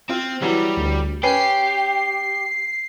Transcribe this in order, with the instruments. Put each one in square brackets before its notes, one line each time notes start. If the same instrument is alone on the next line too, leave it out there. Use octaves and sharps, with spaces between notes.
[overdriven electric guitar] C4 [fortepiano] F4
[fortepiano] E3 F#3 [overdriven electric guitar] G3
[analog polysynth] D2
[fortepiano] C#4 B4 G#5 [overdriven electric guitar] G4 [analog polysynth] C7